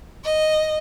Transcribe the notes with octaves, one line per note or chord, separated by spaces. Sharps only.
D#5